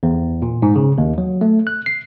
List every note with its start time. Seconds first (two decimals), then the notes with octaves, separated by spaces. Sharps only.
0.03 E2
0.42 A#2
0.62 G#2
0.76 C#3
0.98 D#2
1.18 F#3
1.41 A3
1.67 F#6
1.86 C7